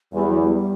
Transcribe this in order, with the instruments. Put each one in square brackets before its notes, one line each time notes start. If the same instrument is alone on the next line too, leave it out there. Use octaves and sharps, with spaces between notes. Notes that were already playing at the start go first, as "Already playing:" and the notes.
[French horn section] E2 [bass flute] G3
[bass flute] F#3
G3